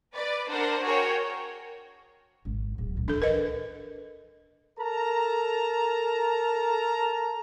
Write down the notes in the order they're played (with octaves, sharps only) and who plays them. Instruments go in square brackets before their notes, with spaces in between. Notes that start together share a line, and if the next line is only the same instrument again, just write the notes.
[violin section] B4 D5
D4 A#4 C5 F#5
F#4 G#4 A#4 C#5 G5
[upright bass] G#1
D1
C#2 A2
[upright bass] E3 [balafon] D4 A4
[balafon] A#4 B4 D#5
[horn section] A4 A#4 A5 A#5